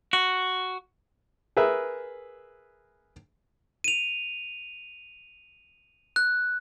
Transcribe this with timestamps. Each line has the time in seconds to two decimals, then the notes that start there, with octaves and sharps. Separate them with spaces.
0.13 F#4
1.57 G#4 A#4 B4 E5
3.84 D#7 F7
6.16 F#6